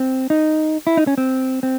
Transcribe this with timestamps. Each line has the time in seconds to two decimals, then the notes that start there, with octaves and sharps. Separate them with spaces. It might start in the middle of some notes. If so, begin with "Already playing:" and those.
Already playing: C4
0.30 D#4
0.87 E4
0.97 D#4
1.07 C#4
1.18 C4
1.63 C4